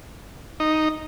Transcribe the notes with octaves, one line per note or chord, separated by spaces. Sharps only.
D#4